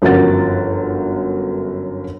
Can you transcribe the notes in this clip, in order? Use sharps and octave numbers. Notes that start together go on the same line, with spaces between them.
G1 F#2 F3 A#4 F#5 A6